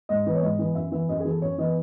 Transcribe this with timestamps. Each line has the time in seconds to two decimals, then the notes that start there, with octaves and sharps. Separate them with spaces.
0.09 G#2 D#5
0.26 E3 B3
0.35 C#5
0.42 G#2 D#5
0.59 E3 B3
0.75 F#2 E5
0.92 E3 B3 E5
1.09 F#2 D#5
1.20 G#4
1.25 E3
1.30 B3 A4
1.42 F#2 C#5
1.58 E3 B3 D#5